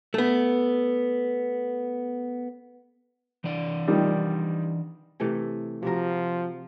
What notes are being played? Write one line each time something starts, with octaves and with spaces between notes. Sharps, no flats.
A3 B3
E3 D4 D5
D#3 F3 G3
C3 E3 A3
C3 F3 F#4 A#4